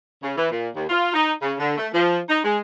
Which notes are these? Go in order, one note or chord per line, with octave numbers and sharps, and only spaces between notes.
C#3
E3
A#2
D#2
F4
D#4
C#3
D3
A3
F3
D#4
G#3